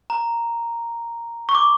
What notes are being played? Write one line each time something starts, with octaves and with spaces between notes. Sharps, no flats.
A#5
C#6
D6